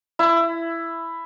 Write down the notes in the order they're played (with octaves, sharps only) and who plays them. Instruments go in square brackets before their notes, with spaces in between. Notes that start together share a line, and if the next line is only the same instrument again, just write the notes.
[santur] E4